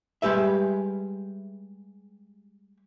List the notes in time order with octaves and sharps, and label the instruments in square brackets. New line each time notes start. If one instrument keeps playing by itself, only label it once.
[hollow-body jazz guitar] G3 G#3 G4 B4 E5